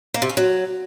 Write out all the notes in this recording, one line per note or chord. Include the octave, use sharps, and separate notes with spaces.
A#3
C3
C#4
F#3